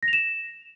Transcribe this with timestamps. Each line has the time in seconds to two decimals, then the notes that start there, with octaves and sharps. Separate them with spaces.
0.03 A#6
0.08 F7
0.13 E7